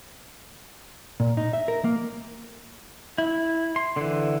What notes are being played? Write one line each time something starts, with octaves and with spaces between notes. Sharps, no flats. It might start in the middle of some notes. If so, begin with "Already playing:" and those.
A#2
D#4
E5
A#4
A#3
E4
C6
D3 E3